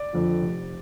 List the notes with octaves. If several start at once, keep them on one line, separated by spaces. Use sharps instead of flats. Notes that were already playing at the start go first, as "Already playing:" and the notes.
Already playing: D5
F2 D3 F3
F1